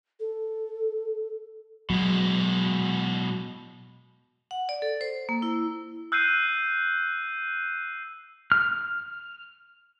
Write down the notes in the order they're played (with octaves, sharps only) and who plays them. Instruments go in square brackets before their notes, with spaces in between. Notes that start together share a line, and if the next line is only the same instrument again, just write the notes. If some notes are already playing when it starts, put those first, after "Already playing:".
[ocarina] A4
[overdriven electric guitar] B2 G#3 [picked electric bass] F#3
[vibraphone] F#5
D5
A4
C5
A#3
E4
[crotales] E6 F#6 G6 C7 D#7
[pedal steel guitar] F6